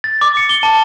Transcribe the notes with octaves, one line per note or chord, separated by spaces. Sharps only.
A6
D6
C#7
G7
A5